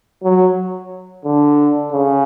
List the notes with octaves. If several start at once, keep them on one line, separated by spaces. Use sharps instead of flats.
F#3
D3
C#3